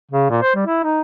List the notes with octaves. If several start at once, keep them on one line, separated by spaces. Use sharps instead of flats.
C#3
A#2
C5
G3
E4
D#4